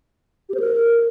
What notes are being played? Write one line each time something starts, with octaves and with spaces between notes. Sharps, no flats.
G4
C5
A#4